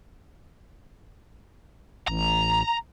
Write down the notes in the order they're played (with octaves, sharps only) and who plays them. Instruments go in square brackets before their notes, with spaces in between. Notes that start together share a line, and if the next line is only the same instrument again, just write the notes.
[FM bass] A1 [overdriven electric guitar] A#5